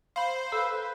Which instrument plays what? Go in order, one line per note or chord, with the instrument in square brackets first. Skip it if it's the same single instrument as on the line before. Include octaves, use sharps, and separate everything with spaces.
[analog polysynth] C5 [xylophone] F5 B5
[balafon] A4 [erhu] B4 [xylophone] F5 E6